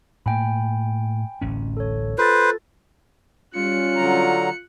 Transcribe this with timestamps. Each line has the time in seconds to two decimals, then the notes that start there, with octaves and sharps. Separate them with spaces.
0.26 A2 A#3 G5 G#5 B5
1.41 D1 A1 C#4
1.77 A4 C#5
2.18 F4 A4 B4 C5 A6
3.55 G3 C#4 F4 F#6 C#7
3.96 D3 F#3 A#5